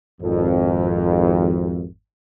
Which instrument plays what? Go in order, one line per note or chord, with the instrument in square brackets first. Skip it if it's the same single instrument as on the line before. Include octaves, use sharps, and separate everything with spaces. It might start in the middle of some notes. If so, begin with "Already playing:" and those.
[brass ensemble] G#1 F2